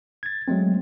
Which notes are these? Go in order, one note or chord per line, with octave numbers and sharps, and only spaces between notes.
G#6 A6
F#3 G#3 A3 C4